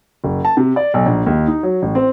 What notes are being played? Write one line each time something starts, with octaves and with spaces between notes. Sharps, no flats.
F#1
A5
C3
D5
B1
A#1
D#2
D#4
F#3
A1
C4